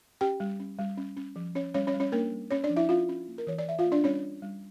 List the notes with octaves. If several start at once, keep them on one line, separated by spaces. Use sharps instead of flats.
C#4 G4 G5
G3
C#4
G3
C#4
C#4
F3
C#4 C#5
G3 C#4 C#5
C#4 C#5
G3
C#4 C#5
A#3 D4 A#4
G3
C#4 C#5
D4 D5
F3
E4 E5
C#4 F4 F5
C#4
A#3
A#4
E3 C#5
D5
E3 E5
F4 F5
A#3
D4 D5
G3 C#4 C#5
C#4
G3